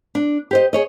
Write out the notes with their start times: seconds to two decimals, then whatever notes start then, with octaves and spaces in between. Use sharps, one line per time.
0.15 D4
0.51 G4 C5 D#5
0.73 G#4 C#5 D#5